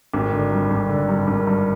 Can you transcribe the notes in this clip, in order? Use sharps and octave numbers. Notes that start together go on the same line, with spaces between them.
G#1
D3
G2
G#1
D3
G2
G#1
G2